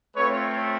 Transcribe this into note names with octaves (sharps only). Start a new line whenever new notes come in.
A3 C4 F4 B4 C#5